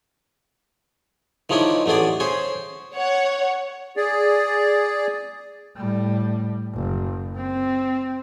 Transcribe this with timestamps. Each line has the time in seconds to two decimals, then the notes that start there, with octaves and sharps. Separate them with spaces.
1.49 D#3 F3 G#3 C#4 D4 E4
1.86 A1 A3 B3 G#4 D5
2.20 C#4 G#4 C5
2.95 C#5 F#5
3.97 G#4 D5
5.77 A2 G3
6.74 F#1
7.36 C4